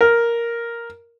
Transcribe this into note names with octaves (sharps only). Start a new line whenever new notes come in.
A#4